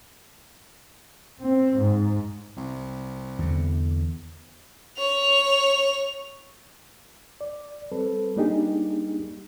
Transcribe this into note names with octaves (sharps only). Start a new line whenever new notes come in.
C4
G#2
C2
E2 D3
C#5 F7
D5
G3 C4 A4 B4
G3 A#3 D4 D#4 G4 G#4